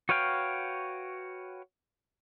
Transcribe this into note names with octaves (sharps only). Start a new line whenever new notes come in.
F#4 B4 C#5 F5 G5